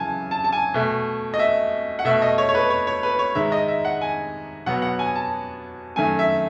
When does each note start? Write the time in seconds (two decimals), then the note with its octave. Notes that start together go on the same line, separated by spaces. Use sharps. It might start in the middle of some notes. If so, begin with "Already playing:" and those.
Already playing: F#2 C#3 E3 G#5 A5
0.31 A5
0.44 A5
0.53 G#5
0.74 B2 A3
1.34 D#5
1.39 E5
1.99 F#5
2.05 B2 A3 E5
2.22 D#5
2.38 C#5
2.49 C#5
2.55 B4
2.70 C#5
2.87 C#5
3.03 B4
3.19 C#5
3.35 G#2 D#3 G#3 E5
3.52 D#5
3.68 E5
3.85 F#5
4.01 G#5
4.66 B2 F#3 B3 F#5
4.82 F#5
4.99 G#5
5.15 A5
5.96 F#2 D#3 A3 G#5
6.19 E5